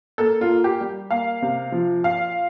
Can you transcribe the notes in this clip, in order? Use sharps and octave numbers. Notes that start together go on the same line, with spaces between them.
A#3 A4
F4
A#3
G4
G3
A#3 F5
C3
F3
A#2 F5